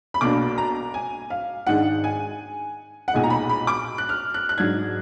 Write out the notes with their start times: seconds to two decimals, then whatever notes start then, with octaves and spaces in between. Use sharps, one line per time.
0.14 B5
0.21 B1 B2 A#3 D4 D6
0.58 A#5
0.94 G#5
1.30 F5
1.67 G#2 D#3 G#3 D4 F#5
2.04 G#5
3.08 F#5
3.13 B1 A#2 G#3 D#4 G#5
3.24 A#5
3.30 B5
3.49 B5
3.67 D6
3.98 F#6
4.09 F6
4.34 F#6
4.49 F#6
4.58 G#2 F#3 D4 G#6